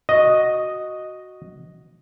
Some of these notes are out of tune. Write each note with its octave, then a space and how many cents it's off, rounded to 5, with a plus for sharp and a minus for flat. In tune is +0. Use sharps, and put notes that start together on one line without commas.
F#4 +0 D#5 +0